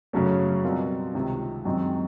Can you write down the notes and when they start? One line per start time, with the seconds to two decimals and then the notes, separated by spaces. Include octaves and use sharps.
0.13 F#2 C#3 F#3 A3 C#4
0.64 B2 G3 C4 F4 A#4
1.14 C#2 C3 D#3
1.65 F#2 D#3 G#3 C4